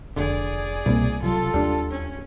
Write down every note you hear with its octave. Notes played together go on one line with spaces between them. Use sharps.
F1 D3 G#4 D5
C2 B2 A3 A#3
C3 F#3 F4 A4
D#2 G3 D4
C#4